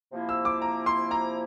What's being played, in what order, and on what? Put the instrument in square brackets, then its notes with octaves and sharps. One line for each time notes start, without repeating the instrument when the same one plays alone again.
[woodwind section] C3 F3 A#3 E4
[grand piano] E6
D6
A#5
C6
A#5